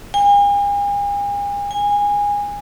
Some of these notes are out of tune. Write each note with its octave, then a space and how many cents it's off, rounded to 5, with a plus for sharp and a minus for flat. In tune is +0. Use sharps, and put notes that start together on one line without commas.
G#5 -45
G#5 -20